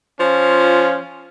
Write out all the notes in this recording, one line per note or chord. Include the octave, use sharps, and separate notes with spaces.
F3 C#4 F4